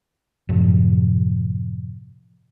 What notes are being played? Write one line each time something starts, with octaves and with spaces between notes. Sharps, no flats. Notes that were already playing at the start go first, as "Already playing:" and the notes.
F#2 A2 C3 F3